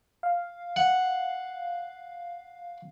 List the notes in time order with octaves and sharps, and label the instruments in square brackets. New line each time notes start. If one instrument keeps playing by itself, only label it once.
[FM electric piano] F5
[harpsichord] F#5